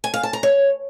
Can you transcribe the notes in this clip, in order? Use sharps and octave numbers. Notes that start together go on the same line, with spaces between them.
G#5
F5
A5
A#5
C#5